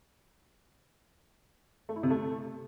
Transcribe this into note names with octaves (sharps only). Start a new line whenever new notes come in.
A3
E4
C3
A3